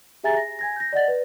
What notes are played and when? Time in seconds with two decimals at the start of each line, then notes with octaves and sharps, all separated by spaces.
0.24 G4 G#4 E5 G#5 A#5 A6
0.37 A#6
0.59 G#5 G#6 A#6
0.76 G6 A#6
0.93 D5 D#5 F#5 A6
1.08 B4